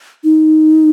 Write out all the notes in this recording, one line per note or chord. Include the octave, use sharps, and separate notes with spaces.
D#4